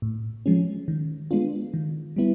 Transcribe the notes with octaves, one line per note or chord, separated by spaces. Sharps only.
A2
F3 G#3 C#4
D#3
G#3 B3 D4 F4
D#3
G3 B3 E4